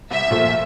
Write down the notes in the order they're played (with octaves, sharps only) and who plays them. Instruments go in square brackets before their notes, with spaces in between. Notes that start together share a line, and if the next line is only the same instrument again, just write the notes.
[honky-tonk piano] C2 [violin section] E5
[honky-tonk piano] A#2 F3 A3